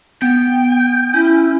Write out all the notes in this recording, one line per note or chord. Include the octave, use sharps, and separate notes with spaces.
B3 G5
C#4 E4